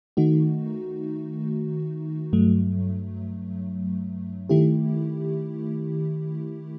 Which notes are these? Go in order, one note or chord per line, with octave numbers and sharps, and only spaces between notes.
D#3 A3 D#4 F#4
G2 F#3 A3
D#3 A3 E4 G4